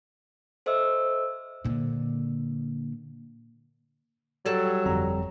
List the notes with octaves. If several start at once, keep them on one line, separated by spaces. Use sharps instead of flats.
A4 C5 D#5 E5 E6
A#2 D3
F#3 G3 A4
G1 F2 A#5